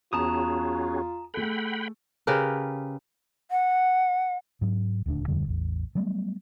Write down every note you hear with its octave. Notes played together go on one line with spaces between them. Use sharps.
E2 C#4 F4 F#4 G#4 A5 A#5 D#6
A3 G#4 A4 F#5 G5 B5
C#3 G4 A#4 B4
F#5
G#2 F#3
D#1 D2 C4 D4
D#1 F2 D3 G3
A1 E2
F#3 G3 A3 B3